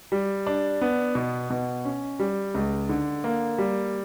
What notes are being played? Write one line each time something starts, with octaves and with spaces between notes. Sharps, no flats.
G3
D4
B3
B2
B2
C#4
G3
C#2
D3
A#3
G3